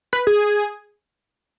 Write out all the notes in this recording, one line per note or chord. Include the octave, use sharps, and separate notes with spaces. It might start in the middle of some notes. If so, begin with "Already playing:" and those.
B4
G#4